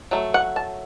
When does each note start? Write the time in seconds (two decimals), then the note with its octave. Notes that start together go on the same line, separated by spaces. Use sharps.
0.11 F#3 A3
0.34 F#5
0.56 A5